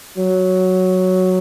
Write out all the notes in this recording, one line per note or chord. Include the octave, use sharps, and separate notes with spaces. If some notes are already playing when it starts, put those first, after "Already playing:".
F#3